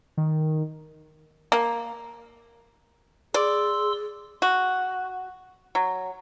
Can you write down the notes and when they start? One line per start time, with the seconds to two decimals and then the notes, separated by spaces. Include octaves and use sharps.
0.17 D#3
1.52 A#3
3.34 G#4 D5 C6 E6
4.42 F#4
5.75 F#3